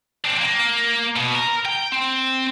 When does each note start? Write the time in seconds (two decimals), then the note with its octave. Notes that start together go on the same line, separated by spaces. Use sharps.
0.25 C4 D4
0.40 A#3
1.16 B2
1.35 A#4
1.65 G5
1.92 C4